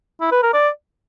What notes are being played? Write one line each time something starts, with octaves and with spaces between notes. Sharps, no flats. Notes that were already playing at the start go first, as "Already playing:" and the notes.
E4
B4
A#4
D5